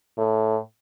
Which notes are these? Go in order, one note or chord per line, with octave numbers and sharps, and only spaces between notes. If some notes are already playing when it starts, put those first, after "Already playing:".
A2